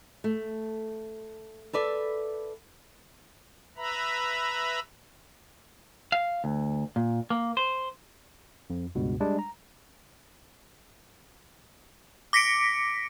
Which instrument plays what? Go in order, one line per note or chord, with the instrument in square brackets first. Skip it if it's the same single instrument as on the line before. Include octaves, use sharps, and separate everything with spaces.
[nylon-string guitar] A3
A4 B4 D5 E5
[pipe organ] B4 E5 A#5 B5
[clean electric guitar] F5
D2
A#2
A#3
C5
[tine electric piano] F2
C#2 G2 B2
G3 G#3 D4
A#5
[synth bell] D6 A#6 B6 C#7 D7